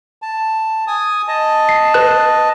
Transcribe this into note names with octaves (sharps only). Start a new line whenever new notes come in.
A5
G#5 D#6
D#5 A5
C7
B4 F#6